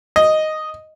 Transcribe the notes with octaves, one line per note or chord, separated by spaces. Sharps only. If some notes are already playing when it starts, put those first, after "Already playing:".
D#5